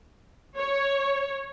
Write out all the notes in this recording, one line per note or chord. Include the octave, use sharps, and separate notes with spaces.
C#5